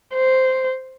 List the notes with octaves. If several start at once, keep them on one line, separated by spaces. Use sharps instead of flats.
C5